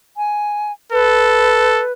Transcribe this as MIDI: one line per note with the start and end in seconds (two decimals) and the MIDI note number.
0.17 0.72 80
0.92 1.83 69
0.92 1.92 71